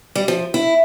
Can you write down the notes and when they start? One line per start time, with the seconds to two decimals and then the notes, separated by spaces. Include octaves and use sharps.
0.15 G3
0.28 F3
0.54 E4